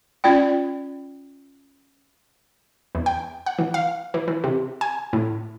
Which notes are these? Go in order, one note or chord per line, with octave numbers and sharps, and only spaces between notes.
C#4 F4 D5 G5
E2
G5
F#5
E3
F5
E3
E3
C3
G#5
A2